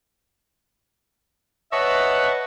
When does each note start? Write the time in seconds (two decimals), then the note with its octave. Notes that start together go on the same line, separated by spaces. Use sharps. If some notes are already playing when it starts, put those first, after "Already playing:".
1.72 B4 C#5 D#5 E5 F#5 A5